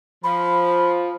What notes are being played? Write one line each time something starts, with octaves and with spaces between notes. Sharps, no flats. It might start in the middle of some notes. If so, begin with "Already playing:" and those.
F3 B5